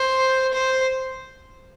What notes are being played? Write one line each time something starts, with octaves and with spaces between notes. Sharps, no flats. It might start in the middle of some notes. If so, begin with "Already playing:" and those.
Already playing: C5
C5